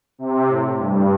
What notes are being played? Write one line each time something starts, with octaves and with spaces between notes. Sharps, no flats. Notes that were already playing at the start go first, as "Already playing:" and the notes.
C3
A2
G2